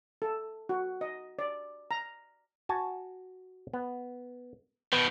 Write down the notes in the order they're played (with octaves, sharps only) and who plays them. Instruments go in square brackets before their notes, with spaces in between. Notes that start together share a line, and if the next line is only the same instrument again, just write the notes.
[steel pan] A4
F#4
D#5
D5
A#5
[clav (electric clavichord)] F#4 G#5 A5
B3
[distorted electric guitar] B2 D#3 [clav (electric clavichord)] B3 B4 F#5